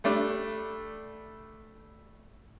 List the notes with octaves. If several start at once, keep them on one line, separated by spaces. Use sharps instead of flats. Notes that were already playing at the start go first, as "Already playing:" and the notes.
G3 A3 D4